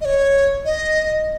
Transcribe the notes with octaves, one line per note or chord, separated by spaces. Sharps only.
D#5
C#5
D#5